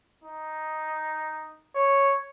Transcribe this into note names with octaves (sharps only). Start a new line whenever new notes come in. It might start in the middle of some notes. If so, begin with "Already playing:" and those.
D#4
C#5